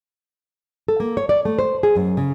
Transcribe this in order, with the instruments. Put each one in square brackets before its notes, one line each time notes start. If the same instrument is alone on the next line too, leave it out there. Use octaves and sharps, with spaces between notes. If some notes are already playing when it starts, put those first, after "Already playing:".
[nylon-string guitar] A4
A#3
C#5
D5
A3
C5
G#4
F#2
C#3